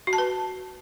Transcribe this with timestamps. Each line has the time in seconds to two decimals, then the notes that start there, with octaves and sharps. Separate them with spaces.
0.07 F#4
0.13 A5
0.18 B4